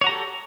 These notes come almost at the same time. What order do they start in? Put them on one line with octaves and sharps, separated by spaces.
C#5 F#4 A#5 G4 A4